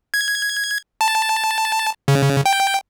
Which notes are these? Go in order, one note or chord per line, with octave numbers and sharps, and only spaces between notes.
G#6
A5
C#3
G5